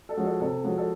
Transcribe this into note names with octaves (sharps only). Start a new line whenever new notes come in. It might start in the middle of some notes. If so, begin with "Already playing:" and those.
A4
F3 G#3 C#4 F#4
A4
C3 A4
F3 G#3 C#4 F#4
A4